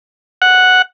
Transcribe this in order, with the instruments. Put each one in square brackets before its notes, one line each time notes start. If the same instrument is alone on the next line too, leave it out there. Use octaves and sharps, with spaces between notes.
[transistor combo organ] F#5